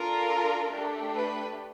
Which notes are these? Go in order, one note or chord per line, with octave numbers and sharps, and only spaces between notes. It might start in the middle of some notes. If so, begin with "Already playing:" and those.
Already playing: D4 F4 A4 A#4
A3 D4 G4
B4